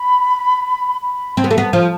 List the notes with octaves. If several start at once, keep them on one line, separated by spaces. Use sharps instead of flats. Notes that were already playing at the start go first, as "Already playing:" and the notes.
Already playing: B5
B5
C4 A5
B3
A3
B3
F3